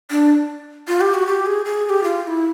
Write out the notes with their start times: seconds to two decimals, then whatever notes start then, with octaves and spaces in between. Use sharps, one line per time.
0.11 D4
0.88 F4
1.01 G4
1.14 F#4
1.27 G4
1.46 G#4
1.65 G#4
1.85 G#4
1.89 G4
2.04 F4
2.23 F4
2.27 E4